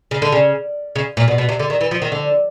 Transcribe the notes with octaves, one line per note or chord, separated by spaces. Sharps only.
C#3
D3
C#3
C#3
A#2
B2
B2
C3
D3
D#3
E3
F3
D#3
D3